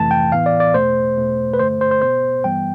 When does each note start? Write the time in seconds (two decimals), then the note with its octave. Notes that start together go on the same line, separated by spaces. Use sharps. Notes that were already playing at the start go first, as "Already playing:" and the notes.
Already playing: F2 C3 E3 A3 A5
0.11 G5
0.32 A2 E3 B3 F5
0.46 D5
0.60 D5
0.74 E2 B2 A3 C5
1.17 E2 B2 A3
1.54 B4
1.59 G2 D3 A3 C5
1.81 C5
1.91 C5
2.02 B2 B3 C5
2.44 G2 E3 G3 B3 G5